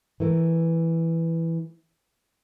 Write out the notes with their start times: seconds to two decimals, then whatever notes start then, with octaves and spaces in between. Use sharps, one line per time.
0.20 E3 A3 A#4